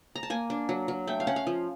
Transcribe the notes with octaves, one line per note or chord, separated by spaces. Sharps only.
A#5
A5
A#3 G#5
D4
F#3
F#3
A3 G5
F5
C#4 F#5
F5
F3